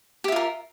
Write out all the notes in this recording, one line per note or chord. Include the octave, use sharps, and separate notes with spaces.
F4 G4 A#4 E5